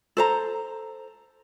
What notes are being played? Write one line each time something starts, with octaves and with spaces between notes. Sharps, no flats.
A4 C5 A#5